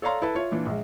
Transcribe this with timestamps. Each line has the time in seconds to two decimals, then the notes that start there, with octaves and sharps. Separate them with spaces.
0.02 A4 C#5 D5 F5 A#5 C6
0.22 E4 A4 B4 A5
0.35 F4 C#5 E5
0.52 A#2 E3 D4
0.66 A#1 G#3